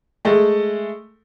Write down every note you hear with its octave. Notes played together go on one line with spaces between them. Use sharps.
G#3 A3